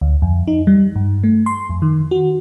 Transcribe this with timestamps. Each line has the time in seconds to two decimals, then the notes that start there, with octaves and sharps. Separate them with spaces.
0.01 D2
0.22 F2
0.47 D#4
0.67 G3
0.95 G2
1.24 A3
1.46 C6
1.69 F2
1.82 D#3
2.11 F#4